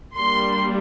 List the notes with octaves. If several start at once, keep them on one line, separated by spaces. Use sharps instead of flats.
G3 A#3 D4 C6